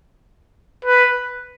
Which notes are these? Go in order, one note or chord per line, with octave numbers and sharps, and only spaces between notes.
B4